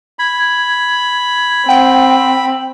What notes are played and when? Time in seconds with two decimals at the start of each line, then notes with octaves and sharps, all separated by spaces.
0.19 B5 G#6
1.69 C4 F#5 G5